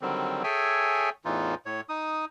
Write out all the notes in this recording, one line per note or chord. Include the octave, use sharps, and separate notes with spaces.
D3 D#3 F#3 G3 C4
G#4 A4 C#5 E5 G5 G#5
E2 A2 E3 D#4 F4
A2 C#5
D#4 D#6